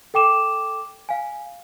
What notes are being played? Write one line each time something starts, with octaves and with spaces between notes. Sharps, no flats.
A4 G5 D6 E7
F5 G#5